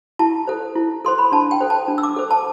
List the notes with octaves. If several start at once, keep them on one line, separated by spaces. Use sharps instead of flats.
E4 A5
A4 C5
E4
A4 C5 C6
B5
D4 A5
G5
A4 C5
A5
D4
E6
D6
A4 C5
A5